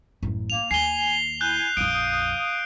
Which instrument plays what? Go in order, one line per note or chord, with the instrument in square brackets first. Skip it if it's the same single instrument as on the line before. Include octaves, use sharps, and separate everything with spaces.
[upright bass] A1 F#2
[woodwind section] A#3 [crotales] F7
[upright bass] D#2 [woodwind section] G#5 [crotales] C7 G7
[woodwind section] E4 G#5 [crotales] F#6 G6
[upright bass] A#1 F2 [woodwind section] F5 D#6 [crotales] D7